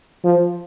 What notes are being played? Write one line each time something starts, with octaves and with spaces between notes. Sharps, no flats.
F3